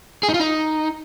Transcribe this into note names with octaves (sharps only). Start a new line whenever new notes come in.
G#4
D#4
F4
D#4